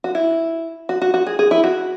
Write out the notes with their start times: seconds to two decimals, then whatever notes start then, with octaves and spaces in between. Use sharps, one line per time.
0.04 F#4
0.15 E4
0.89 F#4
1.02 F#4
1.14 F#4
1.27 G#4
1.39 G#4
1.51 E4
1.64 F#4